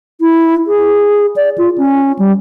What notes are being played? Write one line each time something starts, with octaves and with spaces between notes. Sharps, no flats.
E4
G#4
D5
F4
C#4
G3